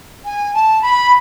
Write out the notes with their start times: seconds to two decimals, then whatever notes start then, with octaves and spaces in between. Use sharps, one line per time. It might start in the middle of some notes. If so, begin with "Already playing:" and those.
0.24 G#5
0.54 A5
0.81 B5